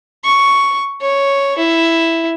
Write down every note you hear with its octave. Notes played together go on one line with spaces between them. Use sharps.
C#6
C#5
E4